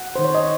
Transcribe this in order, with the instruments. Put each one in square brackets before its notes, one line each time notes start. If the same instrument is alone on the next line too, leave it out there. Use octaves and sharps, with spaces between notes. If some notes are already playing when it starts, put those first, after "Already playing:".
Already playing: [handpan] F#5
D#3 C5
C#5
D#5